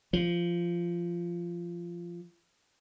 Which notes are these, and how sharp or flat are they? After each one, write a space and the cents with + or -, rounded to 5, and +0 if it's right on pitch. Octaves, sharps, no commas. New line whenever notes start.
F3 -15